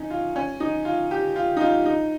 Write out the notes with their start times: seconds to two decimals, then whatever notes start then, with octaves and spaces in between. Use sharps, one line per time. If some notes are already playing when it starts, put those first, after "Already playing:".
Already playing: C#4 D#4
0.10 F4
0.36 C#4
0.60 D#4
0.85 F4
1.11 G4
1.36 F4
1.57 D#4
1.61 F4
1.86 D#4